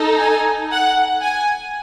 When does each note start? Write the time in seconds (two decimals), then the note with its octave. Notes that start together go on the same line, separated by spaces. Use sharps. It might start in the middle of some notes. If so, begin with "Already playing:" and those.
Already playing: D#4 A4
0.19 G#5
0.71 F#5
1.22 G#5